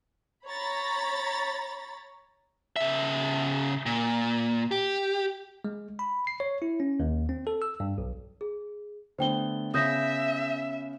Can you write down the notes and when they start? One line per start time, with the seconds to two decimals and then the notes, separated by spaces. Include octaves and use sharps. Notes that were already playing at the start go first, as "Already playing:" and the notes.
0.47 C#5 A#5 B5 A6
2.76 C#3 E5
3.86 A#2
4.71 G4
5.65 G#3
5.99 B5
6.27 C7
6.40 C#5
6.62 E4
6.80 C#4
7.00 D#2
7.29 C4
7.47 A4
7.62 E6
7.80 G2
7.98 B1
8.41 G#4
9.18 D3 A3 B3 C5 G5 G7
9.74 C#3 B3 C#4 E5 D#6 G6 A#6